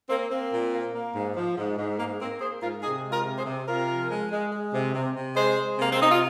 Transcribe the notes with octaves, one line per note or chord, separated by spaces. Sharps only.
A#3 C4
A#3 C4
A#2
A#3
A#3
G#2
F3
G#2
G#2
G#2 A#3
A#3 C4
A#3 G#4 C5
G#2 F4 A#4
C3 D#4 G#4
G#3
F4 A#4
C3
G#4 C5
C3
C3 F4 A#4
F3
G#3
G#3
G#3
C3
C3
C3
G#3 G#4 C5
G#3
C3 A#3
C4
C3 D#4
F4